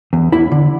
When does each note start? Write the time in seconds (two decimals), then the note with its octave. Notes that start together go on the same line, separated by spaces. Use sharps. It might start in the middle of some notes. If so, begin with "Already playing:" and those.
0.13 E2
0.32 E2 E4
0.51 D3